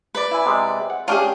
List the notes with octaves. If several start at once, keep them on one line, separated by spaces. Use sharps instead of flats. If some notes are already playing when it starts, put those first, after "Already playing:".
B4 D5
E4 G#5
C3 G#3
F#5
C#4 D4 F4 G4 G#4 F5